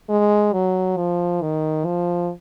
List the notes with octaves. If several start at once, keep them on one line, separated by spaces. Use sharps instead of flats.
G#3
F#3
F3
D#3
F3